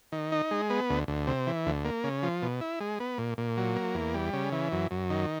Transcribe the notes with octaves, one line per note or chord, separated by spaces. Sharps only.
D#3
D#4
G#3
B3
D2
D2
C3
E3
D2
A#3
C#3
F3
B2
E4
G#3
B3
A#2
A#2
F#3
A#3
E2
G3
C#3
E3
F#2
F#2
D#3